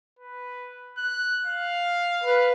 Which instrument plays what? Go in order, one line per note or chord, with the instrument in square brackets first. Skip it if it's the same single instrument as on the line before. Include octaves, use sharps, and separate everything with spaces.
[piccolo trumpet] B4
F#6
F5
[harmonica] B4